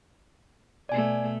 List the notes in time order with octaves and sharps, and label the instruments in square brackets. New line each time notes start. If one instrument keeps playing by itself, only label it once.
[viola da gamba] B2 A3 [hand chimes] D5 G#5